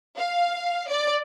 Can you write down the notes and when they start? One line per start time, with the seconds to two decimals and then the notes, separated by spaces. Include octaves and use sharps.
0.18 F5
0.89 D5